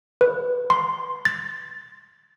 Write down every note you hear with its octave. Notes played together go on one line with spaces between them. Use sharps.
B4
C6
A6